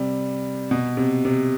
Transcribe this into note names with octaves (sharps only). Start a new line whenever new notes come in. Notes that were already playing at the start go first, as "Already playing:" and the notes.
Already playing: C3 G3
B2
C3
C3